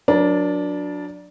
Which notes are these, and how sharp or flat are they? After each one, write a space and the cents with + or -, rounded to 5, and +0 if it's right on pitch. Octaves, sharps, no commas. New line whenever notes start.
F#3 -25 D4 -5 A#4 +30